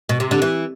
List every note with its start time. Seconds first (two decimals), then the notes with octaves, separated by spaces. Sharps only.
0.09 B2
0.20 C3
0.31 D3
0.42 E3